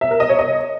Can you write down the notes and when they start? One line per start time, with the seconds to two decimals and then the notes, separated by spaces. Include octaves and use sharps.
0.01 E5
0.11 A#4
0.20 D#5
0.29 C#5
0.39 D#5